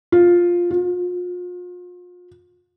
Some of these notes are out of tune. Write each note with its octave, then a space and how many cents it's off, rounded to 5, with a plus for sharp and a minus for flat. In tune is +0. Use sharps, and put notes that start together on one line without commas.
F4 +5
F4 +40